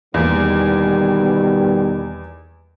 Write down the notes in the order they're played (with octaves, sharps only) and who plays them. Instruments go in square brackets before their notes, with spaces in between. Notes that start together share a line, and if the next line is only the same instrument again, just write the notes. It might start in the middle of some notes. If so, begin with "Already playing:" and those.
[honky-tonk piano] E2 A#3 [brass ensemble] B2 D#3 G3